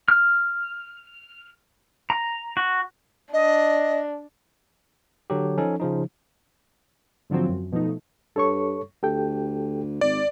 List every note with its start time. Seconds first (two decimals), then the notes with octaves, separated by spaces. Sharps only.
0.08 F6
2.10 A#5
2.57 F#4
3.33 D4 D#5
5.30 D3 F#3 G4
5.57 F3 C#4 D#4 A4
5.80 C#3 F3 D#4
7.30 G#2 D3 F3 F#3 C4
7.49 F#2
7.72 B2 F3 A3 D#4
8.36 G2 A4 C#5 C#6
9.03 D2 G4 A4 G5
10.01 G#1 D5